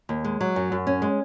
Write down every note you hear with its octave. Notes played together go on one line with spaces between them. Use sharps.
D#2
G#3
F#3
F#2
F#2
C#4
G#3